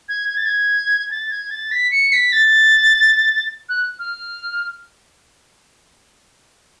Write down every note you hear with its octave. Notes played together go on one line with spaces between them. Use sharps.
G#6
G#6
A6
G#6
A6
G#6
A6
B6
C#7
B6
A6
F#6
F6